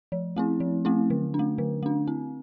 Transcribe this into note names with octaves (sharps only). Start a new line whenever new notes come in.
F3
A3 C4 E4
F3
A3 C4 E4
D3
D4
A3
D3
A3 D4
C4